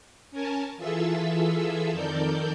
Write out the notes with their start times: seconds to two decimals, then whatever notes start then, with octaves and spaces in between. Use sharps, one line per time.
0.31 C#4 A#4 G#5 A5
0.77 E3 F4 G#4 A4 E5 E6
1.92 F2 D#3 A4 A#4 D5 G6